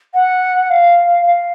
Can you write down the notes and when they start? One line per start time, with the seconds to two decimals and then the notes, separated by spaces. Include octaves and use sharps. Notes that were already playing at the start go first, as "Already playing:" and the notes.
0.14 F#5
0.70 F5
1.26 F5